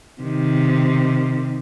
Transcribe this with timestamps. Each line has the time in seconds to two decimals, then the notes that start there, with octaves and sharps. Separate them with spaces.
0.21 C3 D#3